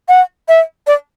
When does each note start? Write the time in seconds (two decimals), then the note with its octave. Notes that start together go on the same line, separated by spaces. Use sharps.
0.08 F#5
0.48 E5
0.87 D5